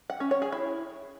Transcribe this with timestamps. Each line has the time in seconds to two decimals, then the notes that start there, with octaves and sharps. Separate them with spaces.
0.10 F#5
0.20 C#4
0.31 C#5
0.42 G#4
0.52 E4